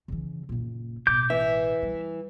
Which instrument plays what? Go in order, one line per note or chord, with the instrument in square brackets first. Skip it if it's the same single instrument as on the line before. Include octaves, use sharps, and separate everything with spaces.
[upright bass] C#3 E3
F#1 A#2
[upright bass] A1 B2 [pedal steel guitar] D6 G6
[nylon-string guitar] E3 [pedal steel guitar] E5
[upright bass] G3